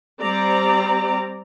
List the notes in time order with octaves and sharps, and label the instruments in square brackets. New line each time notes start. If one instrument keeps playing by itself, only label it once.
[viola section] G3 C4 D5 A#5